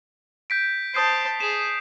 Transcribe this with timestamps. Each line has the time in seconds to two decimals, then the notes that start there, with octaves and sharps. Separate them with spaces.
0.50 G6 B6 D7
0.94 C5 A5 D#6 G6 C7
1.40 G#4 E7